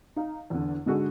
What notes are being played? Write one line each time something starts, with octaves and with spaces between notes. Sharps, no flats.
D#4 F5
E2 D3
G#2 D3 F#4 G#4